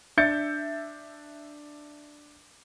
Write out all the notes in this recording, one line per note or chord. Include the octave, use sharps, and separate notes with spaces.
D4 E5 G6 A6 C#7